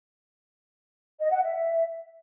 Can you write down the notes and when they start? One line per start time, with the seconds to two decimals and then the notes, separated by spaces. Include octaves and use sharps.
1.20 D#5
1.31 F#5
1.43 E5